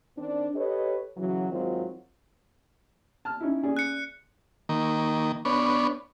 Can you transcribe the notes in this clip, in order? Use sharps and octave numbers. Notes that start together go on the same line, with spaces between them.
D#3 C4 D4
G4 A4 B4 C#5 D#5
C#3 E3 F#3
G#2 D#3 F#3 C4 F4
A5 F6
C#4 D#4 E4
C#4 G#4 D5
F#6 C#7
D#3 A#3
B3 D4 C#5